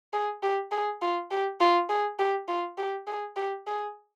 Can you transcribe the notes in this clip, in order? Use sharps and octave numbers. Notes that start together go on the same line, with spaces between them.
G#4
G4
G#4
F4
G4
F4
G#4
G4
F4
G4
G#4
G4
G#4